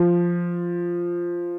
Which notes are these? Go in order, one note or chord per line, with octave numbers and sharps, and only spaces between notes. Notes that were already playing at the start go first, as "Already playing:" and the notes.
Already playing: F3